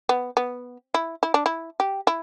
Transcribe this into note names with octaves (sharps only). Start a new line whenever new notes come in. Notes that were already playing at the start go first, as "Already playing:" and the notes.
B3
B3
E4
E4
D4
E4
G4
E4